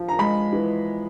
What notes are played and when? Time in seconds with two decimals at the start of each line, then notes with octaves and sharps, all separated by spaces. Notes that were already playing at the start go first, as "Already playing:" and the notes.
Already playing: F3
0.08 A#5
0.19 G#3 B5
0.53 E3